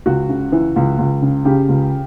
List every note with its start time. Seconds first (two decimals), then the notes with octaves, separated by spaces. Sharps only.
0.06 C#2 F#4
0.29 C#3
0.52 E3
0.76 C#2
0.98 C#2
1.22 C#3
1.45 C#3 G4
1.69 C#2